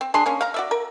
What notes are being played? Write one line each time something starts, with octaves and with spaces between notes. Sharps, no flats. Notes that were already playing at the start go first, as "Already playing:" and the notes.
C4
D4 G#4 C6
A#3 C#4
F5 A#5
F#4 D5 E5
A#4